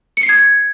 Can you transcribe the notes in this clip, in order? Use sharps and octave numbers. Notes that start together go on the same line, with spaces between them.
C#7
C7
G#6